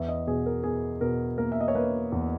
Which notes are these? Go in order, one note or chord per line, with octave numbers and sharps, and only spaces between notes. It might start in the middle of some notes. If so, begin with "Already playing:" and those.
Already playing: E2 E5
D#5
B2 G#4
A#4
B2 G#4
B2 A#4
A#3 A#4
E5
D#5
C#5
A#3 B4
E2